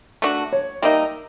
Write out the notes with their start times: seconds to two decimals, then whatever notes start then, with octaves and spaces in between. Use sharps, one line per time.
0.22 A3 D4 F#4
0.53 C#5
0.82 G3 A#3 D#4 E5